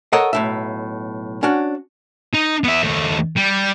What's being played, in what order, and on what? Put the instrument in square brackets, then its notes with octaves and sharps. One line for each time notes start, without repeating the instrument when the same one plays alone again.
[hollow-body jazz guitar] A4 A#4 C#5 D#5 F#5
B1 A2 E5
C#4 D4 F#4
[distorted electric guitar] D#4
B3 E5
D#2 A3
G3